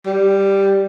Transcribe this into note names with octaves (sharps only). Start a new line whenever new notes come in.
G3